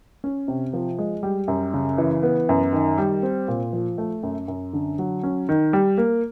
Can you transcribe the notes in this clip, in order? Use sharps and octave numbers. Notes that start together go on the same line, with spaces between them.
C#4
C3
F3
G#3
G3
F#2
C#3
E3
B3
F#2
D#3
G3
C4
A#2
F3
A3
F#2
F#2
D3
F#3
C#4
D#3
G3
A#3